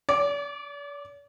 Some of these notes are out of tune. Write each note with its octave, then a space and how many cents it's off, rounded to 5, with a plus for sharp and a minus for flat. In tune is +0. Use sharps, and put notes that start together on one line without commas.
D5 -45 D6 +0